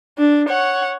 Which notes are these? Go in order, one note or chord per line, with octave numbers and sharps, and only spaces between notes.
D4
C#5 F#5